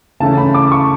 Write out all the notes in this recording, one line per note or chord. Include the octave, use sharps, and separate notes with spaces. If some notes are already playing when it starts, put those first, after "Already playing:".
C#3 E3 A3 C#4 A5
B5
D6
C#6